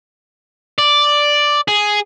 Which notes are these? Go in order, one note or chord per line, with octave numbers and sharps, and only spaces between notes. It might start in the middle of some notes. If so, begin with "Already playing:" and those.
D5
G#4